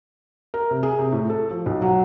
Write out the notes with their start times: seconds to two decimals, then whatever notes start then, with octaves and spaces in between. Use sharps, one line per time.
0.54 A#4
0.71 C3
0.83 G#4
0.99 C3
1.12 A2
1.30 A4
1.51 F3
1.66 B1
1.82 F#3